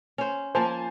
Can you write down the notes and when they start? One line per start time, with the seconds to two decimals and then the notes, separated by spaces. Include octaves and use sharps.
0.18 C#4 C5
0.55 F3 A#3 C5 G#5 A5